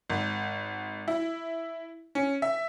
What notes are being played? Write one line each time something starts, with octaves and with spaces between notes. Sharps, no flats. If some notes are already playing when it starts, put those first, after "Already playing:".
G#1
E4
C#4
E5